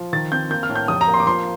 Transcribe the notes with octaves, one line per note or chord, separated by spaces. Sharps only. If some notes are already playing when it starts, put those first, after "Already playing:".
Already playing: F3
D#3 A6
C4 G6
A#3 G6
F6
A2
G6
F1 D#6
A#5
A#3
C6
D6
F3 C6